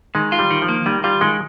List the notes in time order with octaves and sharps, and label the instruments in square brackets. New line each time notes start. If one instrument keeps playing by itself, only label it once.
[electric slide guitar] D#3 [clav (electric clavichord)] G#3
[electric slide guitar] F4
[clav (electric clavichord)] G3
[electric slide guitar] D#3
[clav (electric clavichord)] F3
[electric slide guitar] A#3
[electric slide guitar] D#3 [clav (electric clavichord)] G3
[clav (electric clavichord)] G3 [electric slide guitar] F4
[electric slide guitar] D#3 [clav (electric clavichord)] G#3